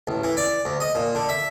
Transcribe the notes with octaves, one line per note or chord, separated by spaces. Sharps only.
A1
E3
D5
D2
D#5
A#2
D3
E5